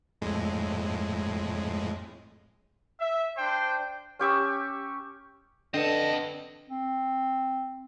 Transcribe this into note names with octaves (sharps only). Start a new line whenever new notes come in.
F2 A2 G#3
E5
D4 C5 G5
C#4 G4 C#6 E6
D3 C4 D4 B4 D#5 A5
C4